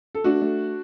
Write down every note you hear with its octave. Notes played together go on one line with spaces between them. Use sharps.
A4
A3 D4 F#4
A3